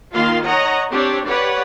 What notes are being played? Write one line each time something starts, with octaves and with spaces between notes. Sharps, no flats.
D#3 A#3 F4 F5 C6
C#5 D#5 F#5 A#5
C4 D4 G4 C#5
G4 B4 C#5 D5 F#5